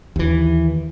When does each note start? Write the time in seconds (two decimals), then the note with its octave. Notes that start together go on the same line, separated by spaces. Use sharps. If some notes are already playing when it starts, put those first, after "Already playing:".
0.16 D#2 E3